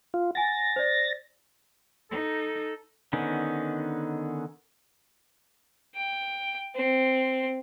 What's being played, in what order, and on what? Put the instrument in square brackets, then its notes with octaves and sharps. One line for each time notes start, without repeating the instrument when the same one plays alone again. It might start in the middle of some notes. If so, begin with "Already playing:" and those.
[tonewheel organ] F4
[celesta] F#5 G#5 [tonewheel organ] A6 A#6
[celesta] C5 D5
[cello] D#4 [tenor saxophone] A4
[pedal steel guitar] D3 D#3 B3 C#4 D#4
[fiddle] G5
C4